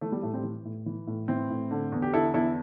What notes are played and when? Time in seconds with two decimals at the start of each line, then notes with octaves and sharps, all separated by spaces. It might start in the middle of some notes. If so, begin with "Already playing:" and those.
0.01 E3 A3
0.12 G3
0.23 A2 A3
0.34 G3 C4
0.43 E3
0.65 A2
0.86 E3
1.07 A2
1.28 E3 C4 E4
1.50 A2
1.71 D3
1.92 E2
2.02 G4
2.13 D3 E4 A4
2.34 E2 E4 A4